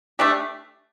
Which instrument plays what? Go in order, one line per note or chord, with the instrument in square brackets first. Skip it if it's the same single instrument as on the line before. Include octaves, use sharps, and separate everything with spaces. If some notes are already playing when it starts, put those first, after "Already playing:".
[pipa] A3 D4 G4